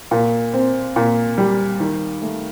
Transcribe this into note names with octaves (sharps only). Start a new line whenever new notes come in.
A#2
C4
A#2
G3
D#3
A3